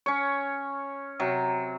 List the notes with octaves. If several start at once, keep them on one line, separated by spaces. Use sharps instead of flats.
C#4 C#5
C3 F#3